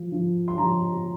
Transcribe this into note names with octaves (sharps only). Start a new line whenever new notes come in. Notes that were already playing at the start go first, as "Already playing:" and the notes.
Already playing: F3
F3
C6
F3 A#5